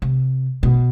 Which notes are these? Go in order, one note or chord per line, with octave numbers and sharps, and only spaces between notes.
C3
B2